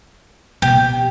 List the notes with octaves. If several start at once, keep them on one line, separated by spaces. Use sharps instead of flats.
B2 G4